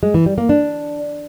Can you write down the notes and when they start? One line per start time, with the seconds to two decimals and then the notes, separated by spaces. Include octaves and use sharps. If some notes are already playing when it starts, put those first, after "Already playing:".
0.03 G#3
0.14 E3
0.26 G3
0.38 A#3
0.49 D4